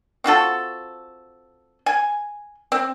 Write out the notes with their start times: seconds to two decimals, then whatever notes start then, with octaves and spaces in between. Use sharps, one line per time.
0.24 C4 F4 F#4 A4
1.86 G#5
2.72 C4